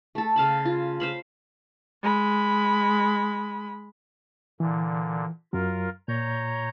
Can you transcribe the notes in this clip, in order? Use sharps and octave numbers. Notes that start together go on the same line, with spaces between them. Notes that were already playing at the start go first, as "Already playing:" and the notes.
A3 A4
C#3 F5 A5 B5
F4
C5 F5 B5
G#3 B5
A#2 D3 E3
F#2 F#3 F4 A#4
A#2 C#5 A#5 G6